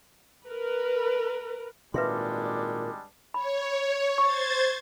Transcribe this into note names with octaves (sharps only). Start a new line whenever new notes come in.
A#4 B4
G#1 A#2 G3 G#3 D4 B4 E5 C6
C#5 B5
C5 C#6 G#6 A6